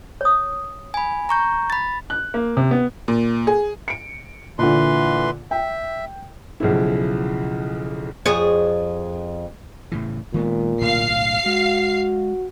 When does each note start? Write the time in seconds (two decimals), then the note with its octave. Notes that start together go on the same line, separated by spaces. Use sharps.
0.21 C#5 D#6
0.94 G#5 B5
1.29 A#5 C#6 G6
1.70 B5 A6
2.10 F#6
2.34 A#3
2.57 C3
2.71 B3
3.08 A#2
3.47 G#4
3.88 C#7 D7
4.59 A#2 D3 E3 B4 C6
5.51 E5 G5
6.60 B1 C#3 F3 E4
8.26 F2 G#4 C#5
9.92 A2 C#3 E3
10.34 A#2 D#3 G#3 B3
10.82 B1 A2 D3 F5 C7
11.46 G#3 F#4